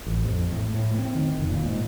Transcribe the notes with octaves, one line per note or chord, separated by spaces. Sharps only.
A1
F2
A2
A2
C4
D#3
F1
A#2
G#2